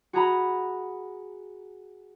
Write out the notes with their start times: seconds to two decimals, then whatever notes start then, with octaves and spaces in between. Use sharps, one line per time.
0.13 F#4 G#4 A#5 B5